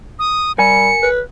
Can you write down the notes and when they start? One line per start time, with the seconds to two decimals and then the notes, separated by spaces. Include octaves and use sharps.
0.19 D#6
0.58 G3 A#4 G#5 C#7
1.03 B4